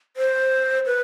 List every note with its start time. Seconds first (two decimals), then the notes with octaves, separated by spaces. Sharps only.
0.17 C5
0.86 B4